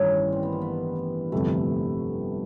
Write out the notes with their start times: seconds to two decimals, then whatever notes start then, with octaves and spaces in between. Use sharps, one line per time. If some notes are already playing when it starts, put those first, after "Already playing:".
Already playing: A1 G2 D#3 C#4
0.32 C4
0.43 B3
0.52 A#3
0.61 B3
1.32 G1 F2 C3 A3